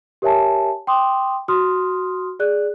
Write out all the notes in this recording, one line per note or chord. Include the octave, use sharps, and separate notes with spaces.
G4 A#4 C#5 E5 G#5 A5
G5 C6 D6 D#6
F#4 C6 D#6 F6
G#4 D5 F#6